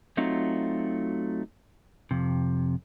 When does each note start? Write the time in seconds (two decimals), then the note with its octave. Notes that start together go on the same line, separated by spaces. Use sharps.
0.17 F#3 A3 C4 D#4 F4 F#4
2.11 F2 C3